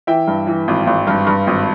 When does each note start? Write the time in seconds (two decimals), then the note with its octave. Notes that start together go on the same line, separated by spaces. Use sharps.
0.07 E3 E5 G5
0.28 G2
0.47 E3
0.68 G#1
0.87 G#1
1.07 G2
1.27 G2
1.47 G#1